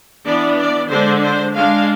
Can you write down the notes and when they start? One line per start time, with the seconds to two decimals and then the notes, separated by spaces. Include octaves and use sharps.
0.25 E3 B3 D4 D5
0.58 D5
0.89 D3 G#3 D4 C5
1.22 C5
1.54 G#3 D4 F5